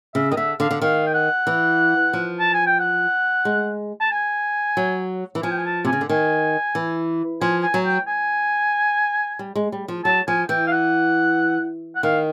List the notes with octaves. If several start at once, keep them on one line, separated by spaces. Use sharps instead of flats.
C#3 E5
D#3 D#5
D3 E5
D3 F5
D3
D#3 F5
G5
F#5
E3
F3
A5
G#5
G5
F#5
G#3
A5
G#5
F#3
E3
F3 G#5
G5
G#5
A5
C3 G#5
C#3
D3
D#3 G#5
E3
F3 G#5
G#5
F#3
G5
G#5
G3
G#3
G3
F3
F#3 A5
F3 G#5
E3 G5
F5
F#5
F#5
D#3 F5